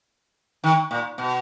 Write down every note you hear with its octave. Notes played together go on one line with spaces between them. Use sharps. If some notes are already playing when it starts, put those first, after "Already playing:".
D#3
A#2
B2